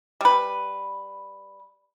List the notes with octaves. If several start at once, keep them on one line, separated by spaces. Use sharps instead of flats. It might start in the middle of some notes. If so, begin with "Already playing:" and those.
G3 B4